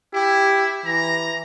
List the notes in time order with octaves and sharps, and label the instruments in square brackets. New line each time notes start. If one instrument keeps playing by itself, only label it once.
[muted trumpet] E4 [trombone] G4
[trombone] E3 [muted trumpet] A#5